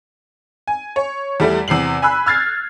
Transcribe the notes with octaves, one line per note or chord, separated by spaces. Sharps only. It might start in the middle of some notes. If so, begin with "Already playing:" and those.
G#5
C#5
E2 G3 A3
E2 C3 C7 F#7
G#5 B5 E6 F#6
E6 F6 G#6 A6 C7